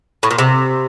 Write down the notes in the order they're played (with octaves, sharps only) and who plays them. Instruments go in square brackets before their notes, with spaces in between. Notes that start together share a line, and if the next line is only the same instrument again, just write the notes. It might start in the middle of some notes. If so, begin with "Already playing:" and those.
[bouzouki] A2
A#2
C3